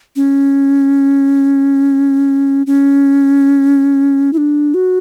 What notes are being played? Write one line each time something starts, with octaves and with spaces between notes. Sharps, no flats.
C#4
C#4
E4
D4
F#4